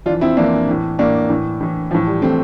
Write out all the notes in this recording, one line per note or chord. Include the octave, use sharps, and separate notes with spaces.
F2 E3 D4 F4
C4 E4
F2 E3 A#3 D4
A2 E3
A2 E3 A#3 D4
A2 E3
A2 E3
A2 E3 F3
G3
A2 E3 A3 C4